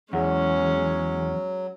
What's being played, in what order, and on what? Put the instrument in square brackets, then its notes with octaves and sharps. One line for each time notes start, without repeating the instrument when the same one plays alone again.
[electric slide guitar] E2 [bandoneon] F#3 [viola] G#3 C#4 [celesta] G#4 F#5